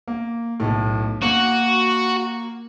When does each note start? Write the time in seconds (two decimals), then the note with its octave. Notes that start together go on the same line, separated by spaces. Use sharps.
0.08 A#3
0.60 B1 A2
1.22 A#3 F#4